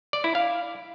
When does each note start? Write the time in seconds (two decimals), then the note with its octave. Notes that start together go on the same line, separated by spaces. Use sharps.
0.13 D5
0.24 E4
0.35 F5